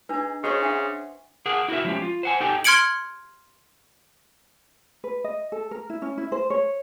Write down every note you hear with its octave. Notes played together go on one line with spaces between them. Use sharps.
D4 D#4 G#4 B4
C#3 C5 C#5 D#5
D4 E5 F#5
G#4 A#4 F#5
E4 F#4 A4 A#4 E5
F3 G#3 C#4 G4
F4
C5 F#5 G#5
D#4 G4 A4 G5 G#5
C6 F6 G#6 C#7 D7 F#7
B4
D#5
A4
A#4
E4
C#4
E4
C5
C#5